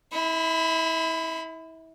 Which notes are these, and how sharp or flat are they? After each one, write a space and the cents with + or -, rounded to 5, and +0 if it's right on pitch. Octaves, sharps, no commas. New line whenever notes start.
E4 -30 B5 +25